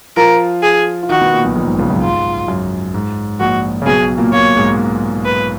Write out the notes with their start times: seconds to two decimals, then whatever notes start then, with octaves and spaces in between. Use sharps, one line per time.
0.17 F3 F4 A#4
0.63 G#4
1.03 F4
1.09 D#3 D#4 F#4
1.21 B2 B3
1.32 A#2 A#3
1.44 B1 B2
1.56 A#1 A#2
1.67 G#2
1.79 C#2 C#3
1.90 F#2
2.02 G#2 F4
2.48 F#2
2.94 G#2
3.40 A#1 A#2 F#4
3.82 C#3
3.86 B1 B2 G#4
4.18 A#2 A#3
4.33 A#2 A#3 C#5
4.56 G#2 G#3
5.25 B4